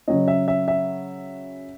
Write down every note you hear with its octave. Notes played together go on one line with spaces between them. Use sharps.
C#3 F#3 C#4 D#5
E5
E5
E5